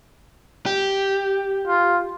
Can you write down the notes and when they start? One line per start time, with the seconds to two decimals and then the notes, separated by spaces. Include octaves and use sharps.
0.66 G4
1.67 F4